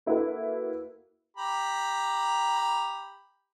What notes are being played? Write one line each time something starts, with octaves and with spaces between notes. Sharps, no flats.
A#3 E4 F#4 A4 B4
G4 A#5 B5